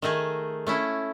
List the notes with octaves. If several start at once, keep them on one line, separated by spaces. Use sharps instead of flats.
D#3 A3 D#4 G#4
A3 C#4 E4